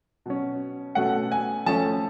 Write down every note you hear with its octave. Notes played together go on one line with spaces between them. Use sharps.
B2 F#3 C#4
B2 A3 C#4 F#5
G#5
F3 A3 C#4 A5